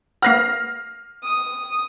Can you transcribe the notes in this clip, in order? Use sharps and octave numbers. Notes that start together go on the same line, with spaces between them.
A#3 B4 F#5 F6 A#6 C7
D#6